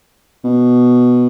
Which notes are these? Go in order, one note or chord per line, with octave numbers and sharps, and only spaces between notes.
B2